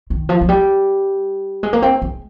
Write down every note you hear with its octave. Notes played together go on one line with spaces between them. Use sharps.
D#3
F3
F3
G3
G#3
A#3
C4
G#3